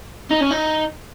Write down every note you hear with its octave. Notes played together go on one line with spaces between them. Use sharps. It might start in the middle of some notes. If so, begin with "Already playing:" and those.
D#4
C#4
D#4